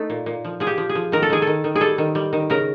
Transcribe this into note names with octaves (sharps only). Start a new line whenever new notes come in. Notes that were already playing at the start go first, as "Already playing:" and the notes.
Already playing: A3 D#4
A#2
A#2
F3
F3 G#4
G4
F3
G#4
F3
D#3 A#4
A4
D#3 G#4
A4
D#3
D#3
G#4
G3 A4
D#3
G3
D#3
C#3 A#4